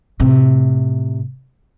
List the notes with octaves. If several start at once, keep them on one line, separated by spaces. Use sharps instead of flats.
A2 C3